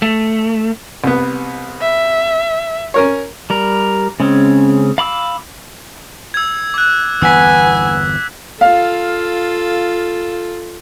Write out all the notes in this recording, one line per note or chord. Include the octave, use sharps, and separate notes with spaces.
A3
C2 B3
E5
C#4 A#4 C#5
G3 A#4
C#3 G#3 C4 C#4
F5 B5 D6 E6
E6 G#6
D6 F#6
G1 E2 E3 B3 G#5 E6 B6
F4 A4 F5